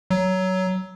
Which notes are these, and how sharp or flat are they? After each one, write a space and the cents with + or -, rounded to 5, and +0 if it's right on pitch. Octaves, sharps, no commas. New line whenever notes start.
F#3 +15